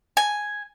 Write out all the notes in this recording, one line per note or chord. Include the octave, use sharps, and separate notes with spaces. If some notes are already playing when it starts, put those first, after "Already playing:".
G#5